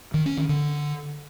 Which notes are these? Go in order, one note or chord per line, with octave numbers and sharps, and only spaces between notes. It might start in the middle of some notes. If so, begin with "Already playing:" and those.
D#3
C#4
D#3
D3